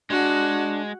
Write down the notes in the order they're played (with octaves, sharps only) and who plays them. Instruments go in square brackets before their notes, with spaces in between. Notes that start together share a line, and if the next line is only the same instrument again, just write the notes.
[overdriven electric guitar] G#3 [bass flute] D4 [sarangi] F#4